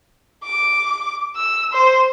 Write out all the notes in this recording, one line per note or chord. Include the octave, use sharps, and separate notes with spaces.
D6
E6
C5